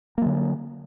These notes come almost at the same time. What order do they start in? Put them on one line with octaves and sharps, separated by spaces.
A#3 F#3 D3